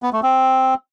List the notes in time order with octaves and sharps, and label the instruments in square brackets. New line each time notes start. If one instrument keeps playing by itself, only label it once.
[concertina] B3
A3
C4